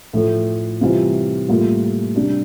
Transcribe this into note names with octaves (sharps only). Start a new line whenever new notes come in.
A2 F3 A3
C3 E3 G3 C4 F4
A2 G3 A#3 F4
C3 G3 D4